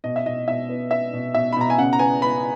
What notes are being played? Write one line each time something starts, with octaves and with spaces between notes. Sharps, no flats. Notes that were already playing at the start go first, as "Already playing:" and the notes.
B2 D#5
E5
B2 D#5
B2 E5
B3
B3 E5
B2
B2 E5
B5
B2 A#5
G#5
C#3 F#5
A#5
B3 G#5
B3 B5